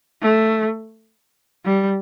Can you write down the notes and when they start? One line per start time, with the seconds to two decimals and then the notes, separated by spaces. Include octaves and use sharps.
0.22 A3
1.65 G3